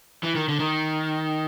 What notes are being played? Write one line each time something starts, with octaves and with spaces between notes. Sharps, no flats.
E3
D#3
D3
D#3